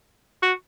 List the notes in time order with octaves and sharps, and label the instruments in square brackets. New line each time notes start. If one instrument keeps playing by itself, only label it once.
[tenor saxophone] F#4